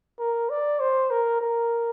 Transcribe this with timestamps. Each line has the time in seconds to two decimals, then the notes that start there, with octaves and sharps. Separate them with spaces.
0.19 A#4
0.50 D5
0.80 C5
1.11 A#4
1.41 A#4